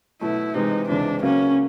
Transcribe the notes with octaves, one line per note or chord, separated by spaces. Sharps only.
B2 F#3 A3 E4
C3 E3 G#3 D#4
C#2 C3 E3 D4
C#3 F#3 A#3 C#4